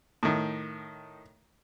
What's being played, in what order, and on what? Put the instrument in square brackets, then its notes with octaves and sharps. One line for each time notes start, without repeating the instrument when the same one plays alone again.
[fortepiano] A2 D#3